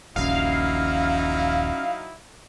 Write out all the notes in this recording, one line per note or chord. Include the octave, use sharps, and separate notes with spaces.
D#1 A#1 D#2 F#3 C#4 D#4 E4 F5